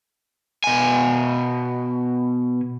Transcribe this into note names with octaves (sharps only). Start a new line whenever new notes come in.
B2 G#5